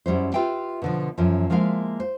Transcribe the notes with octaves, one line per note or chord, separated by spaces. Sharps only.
F#2 G3 E4 C5
F4 G4 B4 E5 F5 G5
B2 D3 F3
F#2 E3 F3
F3 G#3 A#3 E4 F5
C5